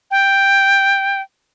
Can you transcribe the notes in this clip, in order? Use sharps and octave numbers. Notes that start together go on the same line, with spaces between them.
G5